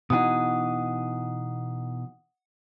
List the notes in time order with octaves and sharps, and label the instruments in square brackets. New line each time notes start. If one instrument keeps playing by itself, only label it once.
[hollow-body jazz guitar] B2 E3 D#4 [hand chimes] F#5 D#6